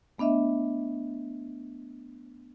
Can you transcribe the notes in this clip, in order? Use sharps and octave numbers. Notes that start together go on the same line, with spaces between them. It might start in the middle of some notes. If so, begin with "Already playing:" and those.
A3 B3 D4 D#5 E5